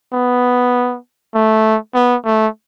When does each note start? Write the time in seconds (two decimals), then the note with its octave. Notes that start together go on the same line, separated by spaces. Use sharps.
0.13 B3
1.34 A3
1.94 B3
2.25 A3